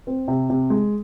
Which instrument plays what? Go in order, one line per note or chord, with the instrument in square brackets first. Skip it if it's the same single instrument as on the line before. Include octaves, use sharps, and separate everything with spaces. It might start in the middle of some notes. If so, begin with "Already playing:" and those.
[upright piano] C4
C3
C3
G#3